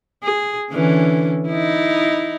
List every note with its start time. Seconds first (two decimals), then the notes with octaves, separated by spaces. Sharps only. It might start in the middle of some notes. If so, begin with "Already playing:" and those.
0.23 G#4
0.71 D3 E3 C#4
1.48 D#4 E4